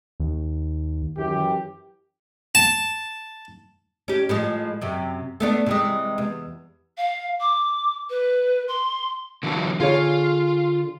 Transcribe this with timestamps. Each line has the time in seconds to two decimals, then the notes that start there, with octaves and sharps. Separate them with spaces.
0.20 D#2 D#3
1.17 F#2 E3 G4
2.55 A5
4.08 C#4 G4
4.29 A2 F3 G#3
4.81 F#2 C3
5.40 A3 B3 D4
5.67 C3 E3 G#3
6.18 E2
6.97 F5
7.40 D6
8.10 B4
8.68 C6
9.43 D3 E3 F#3
9.80 D3 F4 G#4 C#5